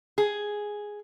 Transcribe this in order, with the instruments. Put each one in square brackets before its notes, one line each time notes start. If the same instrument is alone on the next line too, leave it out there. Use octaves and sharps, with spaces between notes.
[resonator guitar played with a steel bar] G#4